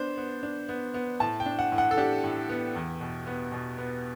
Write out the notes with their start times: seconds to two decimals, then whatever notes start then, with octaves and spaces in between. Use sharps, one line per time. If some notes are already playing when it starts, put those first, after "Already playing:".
Already playing: B3 D4 C5
0.17 B3
0.43 D4
0.69 B3
0.94 B3
1.20 A2 A5
1.40 G5
1.46 D4
1.59 F#5
1.72 A2
1.78 F#5
1.91 A4
1.97 D4 G4
2.24 A2
2.49 B3
2.75 E2
3.01 B2
3.27 B3
3.52 B2
3.78 B3